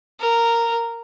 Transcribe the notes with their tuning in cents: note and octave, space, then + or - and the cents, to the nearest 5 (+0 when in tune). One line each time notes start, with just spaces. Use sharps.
A#4 -10